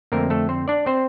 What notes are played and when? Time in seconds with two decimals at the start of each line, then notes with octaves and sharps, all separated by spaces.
0.12 F2 D3 A3 A#3 C4 A#4
0.30 A3 A4
0.49 C4 C5
0.68 D4 D5
0.86 C4 C5